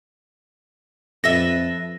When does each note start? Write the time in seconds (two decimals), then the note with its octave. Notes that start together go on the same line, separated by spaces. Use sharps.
1.24 F2 A4 B4 E5 A#6